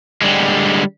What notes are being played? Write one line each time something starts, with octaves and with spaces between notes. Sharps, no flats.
D3 G3 G#3